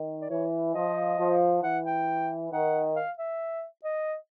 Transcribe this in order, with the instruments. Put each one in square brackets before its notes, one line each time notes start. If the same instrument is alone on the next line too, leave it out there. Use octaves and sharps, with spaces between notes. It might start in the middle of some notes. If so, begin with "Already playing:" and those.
Already playing: [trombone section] D#3
[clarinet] D5
[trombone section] E3 [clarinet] C#5
[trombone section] F3 [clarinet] D#5
[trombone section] F3
[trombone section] E3 [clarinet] F#5
[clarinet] G5
[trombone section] D#3 [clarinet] F#5
[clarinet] F5
E5
D#5